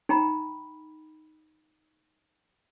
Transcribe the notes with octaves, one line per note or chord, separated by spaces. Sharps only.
D#4 G5 A#5 B5